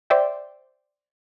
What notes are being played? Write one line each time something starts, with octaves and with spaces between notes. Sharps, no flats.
C5 D5 E5 G5